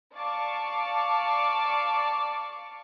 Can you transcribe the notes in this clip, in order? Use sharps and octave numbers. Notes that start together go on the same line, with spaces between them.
D5 F5 A5 C#6 D6